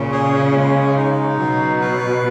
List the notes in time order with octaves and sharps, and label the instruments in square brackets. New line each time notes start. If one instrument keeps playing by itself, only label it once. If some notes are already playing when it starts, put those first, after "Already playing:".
Already playing: [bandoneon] A#2 [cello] C#3
[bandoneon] G#4
G#3
D#4
[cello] B2 [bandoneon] F#3
[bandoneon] B4